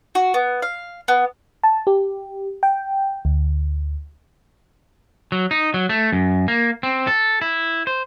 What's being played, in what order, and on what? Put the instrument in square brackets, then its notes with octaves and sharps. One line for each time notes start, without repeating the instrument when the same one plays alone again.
[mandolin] F#4
B3
F5
B3
[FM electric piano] A5
G4
G5
D2
[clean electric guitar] F#3
D#4
F#3
A3
F#2
A#3
C4
A4
E4
C5